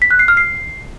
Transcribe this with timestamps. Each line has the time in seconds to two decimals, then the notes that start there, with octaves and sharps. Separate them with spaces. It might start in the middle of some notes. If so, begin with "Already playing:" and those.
0.02 B6
0.11 F#6
0.19 C7
0.28 F6
0.37 C7